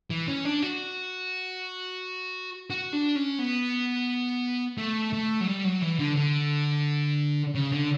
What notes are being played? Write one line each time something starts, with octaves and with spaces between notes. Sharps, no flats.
E3
C#4
D4
F#4
F#4
D4
C#4
B3
A3
A3
F#3
G3
F#3
E3
D3
D3
C#3
D3